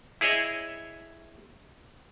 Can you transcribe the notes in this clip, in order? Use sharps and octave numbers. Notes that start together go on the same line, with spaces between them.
E4 G#4 C#5 D#5 E5